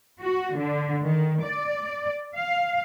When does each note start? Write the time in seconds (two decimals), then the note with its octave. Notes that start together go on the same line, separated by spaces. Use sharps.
0.21 F#4
0.57 D3
1.04 D#3
1.45 D5
2.37 F5